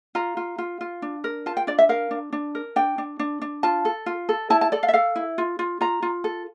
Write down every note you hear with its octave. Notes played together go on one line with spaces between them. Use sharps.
F4 A#5
F4
F4
F4
D4
A#4
F4 A5
G5
D4 D5
E5
A#4 F5
D4
D4
A#4
D4 G5
D4
D4
D4
F4 A5
A4
F4
A4
E4 A5
A5
A4 D5
F5
E5
A4 F5
E4
F4
F4
F4 A#5
F4
A4